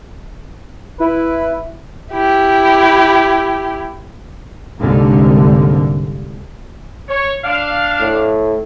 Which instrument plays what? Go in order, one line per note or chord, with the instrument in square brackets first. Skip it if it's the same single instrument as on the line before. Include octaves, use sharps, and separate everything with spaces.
[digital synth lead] E4 [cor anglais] B4
[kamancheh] E4 G4
[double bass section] C2 G#2 D3 A#3
[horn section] C#5
D4 F5
[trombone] A2